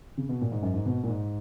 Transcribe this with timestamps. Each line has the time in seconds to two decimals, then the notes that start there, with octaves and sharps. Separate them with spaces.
0.18 C#3
0.29 B2
0.42 A#2
0.52 G#2
0.63 F#2
0.74 G#2
0.86 B2
1.04 A#2
1.08 G#2